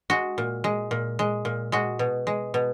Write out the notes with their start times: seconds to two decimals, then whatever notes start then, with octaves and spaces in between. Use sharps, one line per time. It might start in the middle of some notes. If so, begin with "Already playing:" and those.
0.10 G#3 F#4
0.38 A#2
0.64 G#3
0.91 A#2
1.19 G#3
1.45 A#2
1.72 G#3 F#4
1.99 B2
2.27 G#3
2.54 B2